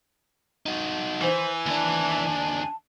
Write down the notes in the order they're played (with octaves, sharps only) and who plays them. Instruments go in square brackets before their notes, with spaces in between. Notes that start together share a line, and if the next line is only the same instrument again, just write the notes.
[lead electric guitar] D#4 F#4
[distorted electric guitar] E3 [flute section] C5 [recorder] G#5
[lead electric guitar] D#2 D4 [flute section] A5